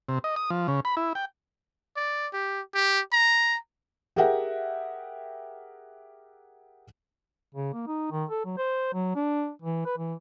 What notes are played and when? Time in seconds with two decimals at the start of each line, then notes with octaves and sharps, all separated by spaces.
0.09 C3
0.24 D#5
0.36 D#6
0.50 F3
0.68 C#3
0.85 B5
0.97 E4
1.15 G5
1.96 D5
2.33 G4
2.74 G4
3.13 A#5
4.16 G4 G#4 A#4 E5 F#5 G5
7.55 C#3
7.74 A#3
7.87 D#4
8.12 D#3
8.30 A4
8.45 F#3
8.57 C5
8.93 F#3
9.16 D4
9.62 E3
9.86 B4
9.98 E3